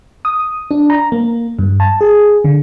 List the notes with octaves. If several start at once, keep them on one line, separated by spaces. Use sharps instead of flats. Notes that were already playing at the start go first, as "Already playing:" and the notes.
D#6
D4
A#5
A#3
G2
A5
G#4
D3